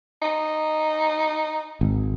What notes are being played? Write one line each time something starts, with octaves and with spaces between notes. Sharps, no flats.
D#4
G#1